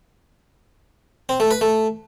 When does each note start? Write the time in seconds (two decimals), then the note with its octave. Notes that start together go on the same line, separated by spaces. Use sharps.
1.29 C4
1.40 A3
1.51 B4
1.61 A3